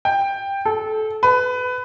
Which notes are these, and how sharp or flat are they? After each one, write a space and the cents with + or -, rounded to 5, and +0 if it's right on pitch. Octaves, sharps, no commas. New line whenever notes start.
G5 +10
A4 -25
B4 +20